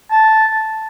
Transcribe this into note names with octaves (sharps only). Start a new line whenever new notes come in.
A5